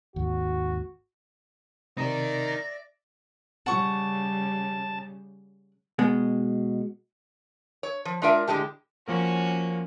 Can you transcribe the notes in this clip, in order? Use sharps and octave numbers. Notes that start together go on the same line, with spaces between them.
G#1 D#2 F#4
C3 D#4 A#4 D5 E5 A#6
C#3 G3 F#5 A5 C#6
B2 G#3
C#5
F3
G#3 D4 F4 A#4 E5
A2 D3 G#3 G4 A5
F3 A#3 C#4 F#4 A#4